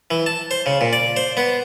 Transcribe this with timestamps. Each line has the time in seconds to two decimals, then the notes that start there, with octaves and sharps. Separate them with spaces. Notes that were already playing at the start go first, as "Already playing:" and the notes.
0.11 E3
0.26 A5
0.51 C5
0.66 C#3
0.81 A#2
0.93 D5
1.16 C5
1.37 B3